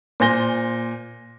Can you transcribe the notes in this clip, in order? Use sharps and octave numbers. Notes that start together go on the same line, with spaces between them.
A#2 C5 G#5 A#6 G7